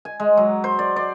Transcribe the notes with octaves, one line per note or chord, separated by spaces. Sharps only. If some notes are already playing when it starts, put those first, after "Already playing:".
G#5
G#3
F#3
C5
D5
D5